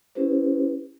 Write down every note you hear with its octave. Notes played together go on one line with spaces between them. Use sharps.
C#4 E4 G4 B4 C5